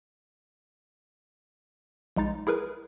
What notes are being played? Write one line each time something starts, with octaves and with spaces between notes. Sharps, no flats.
A#1 G#3 D#4 A6
E4 G#4 A#4 B4